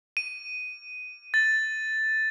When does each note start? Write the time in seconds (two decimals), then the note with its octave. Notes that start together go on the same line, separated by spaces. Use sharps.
0.17 D#7
1.34 A6